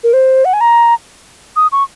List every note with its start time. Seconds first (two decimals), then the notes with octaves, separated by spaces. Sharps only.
0.04 A#4
0.13 C5
0.45 F#5
0.53 G#5
0.61 A#5
1.56 D#6
1.72 C#6